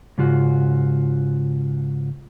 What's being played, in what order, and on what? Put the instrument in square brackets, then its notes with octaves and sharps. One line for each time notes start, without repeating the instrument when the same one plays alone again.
[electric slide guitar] G#2 C#3 F4 F#4